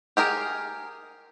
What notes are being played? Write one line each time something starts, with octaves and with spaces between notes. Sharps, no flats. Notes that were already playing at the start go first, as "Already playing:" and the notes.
G4 G#4 A#4